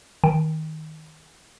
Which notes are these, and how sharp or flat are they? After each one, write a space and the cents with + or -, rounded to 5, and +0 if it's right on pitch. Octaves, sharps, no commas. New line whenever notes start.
D#3 +15 G5 +0